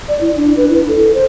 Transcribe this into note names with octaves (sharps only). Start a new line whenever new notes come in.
D5
E4
D4
B4
E4
A4
C5